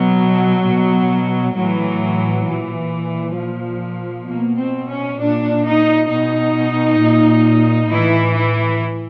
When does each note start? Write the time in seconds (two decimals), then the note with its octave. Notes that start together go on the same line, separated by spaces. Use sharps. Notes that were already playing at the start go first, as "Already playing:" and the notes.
Already playing: B2 F#3
0.65 B2
1.56 A2 E3 F#3
2.46 A#2 E3
3.37 A#2 F3
4.28 B2 A#3
4.58 C4
4.88 C#4
5.19 A#2 D4
5.65 D#4
6.09 B2 D#4
7.00 A#2
7.91 A2 E3 E4
8.36 E4